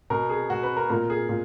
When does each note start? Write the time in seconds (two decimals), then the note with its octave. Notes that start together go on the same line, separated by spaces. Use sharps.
0.10 B2 A#4
0.30 G#4
0.50 B2 F#4
0.63 B4
0.76 A#4
0.89 A#2 A#4
1.10 G#4
1.29 A#2